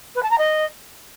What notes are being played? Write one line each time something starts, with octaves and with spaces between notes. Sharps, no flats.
B4
A5
A#5
D#5